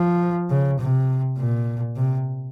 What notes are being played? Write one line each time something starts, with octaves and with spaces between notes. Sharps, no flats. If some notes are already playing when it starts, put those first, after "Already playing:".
Already playing: F3
C#3
C3
A#2
C3